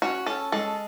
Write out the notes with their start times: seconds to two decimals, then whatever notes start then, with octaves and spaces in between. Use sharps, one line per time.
0.02 C#4 F#4
0.26 C#4 A4
0.52 G#3 A4